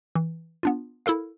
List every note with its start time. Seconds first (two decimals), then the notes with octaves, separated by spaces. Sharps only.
0.15 E3
0.63 B3 D4 F4
1.06 E4 A4 A#4 F5